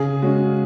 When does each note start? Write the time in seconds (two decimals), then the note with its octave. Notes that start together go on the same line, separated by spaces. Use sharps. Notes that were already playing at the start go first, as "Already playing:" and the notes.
Already playing: C#3 G#4
0.22 G#3 C#4 F#4